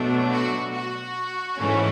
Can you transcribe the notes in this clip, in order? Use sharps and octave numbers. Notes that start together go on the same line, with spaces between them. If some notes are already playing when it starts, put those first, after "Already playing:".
Already playing: B2 F#3 A3 D4
F#4
F#4
G#2 E3 A3 C#4